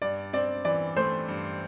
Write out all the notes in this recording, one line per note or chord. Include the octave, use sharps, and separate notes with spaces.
G2 D5
C4 D5
E3 D5
A3 C5
G2